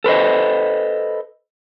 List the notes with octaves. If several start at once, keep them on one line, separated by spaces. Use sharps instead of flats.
A4 B4 C5 D#5